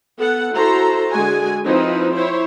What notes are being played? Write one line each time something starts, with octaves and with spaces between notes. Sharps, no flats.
B3 A4 F#5
E4 F#4 A4 C5 A#5 C6
D3 G#3 F#4 G#4 G#5
F3 C4 D#4 E4 B4
E4 C5 C#5